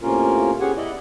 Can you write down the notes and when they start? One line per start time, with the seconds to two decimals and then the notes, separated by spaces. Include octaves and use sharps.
0.02 A2 C3 A#3 C#4 F4 A#4
0.60 B3 C#4 G4 G#4 F#5 G#5
0.77 E4 D5 D#5